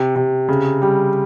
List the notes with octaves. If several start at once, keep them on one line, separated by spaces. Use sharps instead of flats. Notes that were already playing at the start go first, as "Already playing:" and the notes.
Already playing: C3
C3
C#3
G3